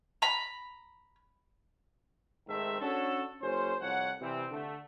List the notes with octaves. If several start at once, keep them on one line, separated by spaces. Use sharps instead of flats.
A#5 B5
G#2 D#3 A3 C4 E5
C#4 D4 F#4 A4
F#1 C#4 C5
C2 F2 C#5 F#5
C3 E3 G3 C4
D3 A3